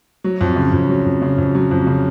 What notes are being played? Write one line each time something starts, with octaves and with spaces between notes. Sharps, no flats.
F#3
F2
C#3
F2
F#3
F2
C#3
F2
F#3
F2
C#3